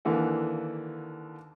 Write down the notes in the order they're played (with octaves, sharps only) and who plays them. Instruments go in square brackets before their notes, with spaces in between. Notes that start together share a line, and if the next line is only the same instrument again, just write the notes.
[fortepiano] D#2 D3 E3 A#3 F#5